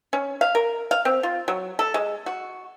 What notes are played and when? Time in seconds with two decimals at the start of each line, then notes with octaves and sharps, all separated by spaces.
0.13 C#4
0.41 F5
0.55 A#4
0.91 F5
1.05 C4
1.23 F4
1.48 F#3
1.79 A4
1.94 G#3
2.26 F#4